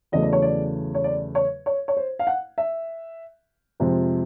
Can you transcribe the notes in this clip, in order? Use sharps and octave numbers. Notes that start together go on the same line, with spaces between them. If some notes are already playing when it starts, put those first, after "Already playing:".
E2 C#3 F#3 A3 D#5
D5
C#5
D5
C#5
D5
C#5
C#5
C#5
C5
F5
F#5
E5
F2 C3 F3 G#3